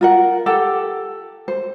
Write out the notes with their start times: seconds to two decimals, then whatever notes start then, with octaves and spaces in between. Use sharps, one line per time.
0.01 F4 A#4 F#5
0.46 G4 A4 F#5
1.48 C5